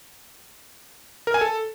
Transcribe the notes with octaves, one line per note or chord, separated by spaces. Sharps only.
A#4
G#5
A4